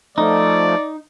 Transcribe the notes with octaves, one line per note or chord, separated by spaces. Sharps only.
F3 A3 D#4 D5